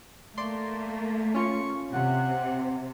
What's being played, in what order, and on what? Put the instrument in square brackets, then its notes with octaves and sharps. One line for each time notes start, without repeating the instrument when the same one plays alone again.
[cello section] A3 A#3 [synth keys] D5 C6
[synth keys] C#4 F4 [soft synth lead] C#6
[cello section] C3 [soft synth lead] F#5